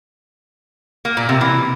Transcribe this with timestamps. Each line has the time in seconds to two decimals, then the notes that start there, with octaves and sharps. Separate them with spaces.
1.05 A#3
1.17 A#2
1.29 C3
1.41 E3